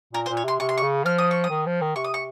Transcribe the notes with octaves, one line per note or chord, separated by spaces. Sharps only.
A#2 A#4
C5
A#2
C#5
C3 C6
C3 C#6
C6
C#6
C#3
F3 F6
D#6
C#6
D#6
D#3
F3
D#3
C3 C#6
D#6
C#6